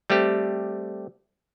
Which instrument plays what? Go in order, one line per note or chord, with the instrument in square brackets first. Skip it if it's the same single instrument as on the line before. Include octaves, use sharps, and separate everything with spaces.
[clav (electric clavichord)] G3 A3 C4 G4